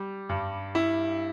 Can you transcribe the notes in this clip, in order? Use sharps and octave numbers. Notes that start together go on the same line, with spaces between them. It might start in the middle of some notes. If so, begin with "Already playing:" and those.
Already playing: G3
G2
E4